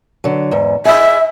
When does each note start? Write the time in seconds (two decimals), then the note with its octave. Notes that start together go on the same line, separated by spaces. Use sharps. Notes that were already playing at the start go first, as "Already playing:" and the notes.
0.24 D3 F#3
0.51 E2 G#2
0.85 G#4 D#5 E5